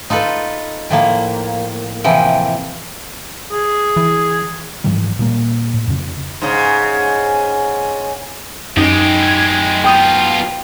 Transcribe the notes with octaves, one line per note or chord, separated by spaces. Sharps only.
D#4 F4 A4 B4
A2 F3 A#3
C3 E3 F3 G5
G#4
E3
G#2 E3 F3 G3
A#2 G3 A#3
A2
F2 C#3
G#2 C#3
F#2 G#3 D#4 G4
G#6
B2 F4 G5 D#6